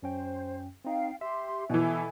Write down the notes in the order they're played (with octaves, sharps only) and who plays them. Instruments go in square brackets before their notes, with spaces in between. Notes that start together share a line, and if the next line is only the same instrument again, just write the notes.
[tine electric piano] F#2 C#4 G5 [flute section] C5
[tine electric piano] C4 D#4 [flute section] F5 G5
[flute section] G4 C6 [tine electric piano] E5
[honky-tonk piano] B2 E3 [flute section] E4 A4 G#5